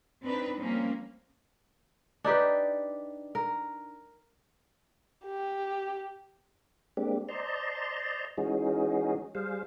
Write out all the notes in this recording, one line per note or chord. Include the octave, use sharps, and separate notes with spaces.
C4 D4 D#4 B4
F3 G3 A#3 C4 C#4
D4 D#4 G4 B4
A#4
G4
G#3 A#3 C4 D4 G4
C5 D5 D#5 A5 A#5 C6
E3 G#3 C#4 D#4 F#4 G#4
G3 G#4 C5 F5